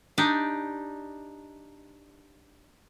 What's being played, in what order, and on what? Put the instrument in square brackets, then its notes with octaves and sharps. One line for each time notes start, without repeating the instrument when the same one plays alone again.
[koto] D4 D#4 G4 D5 D#5